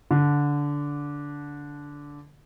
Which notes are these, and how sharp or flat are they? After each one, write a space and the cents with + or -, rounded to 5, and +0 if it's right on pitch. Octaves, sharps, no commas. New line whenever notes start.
D3 -15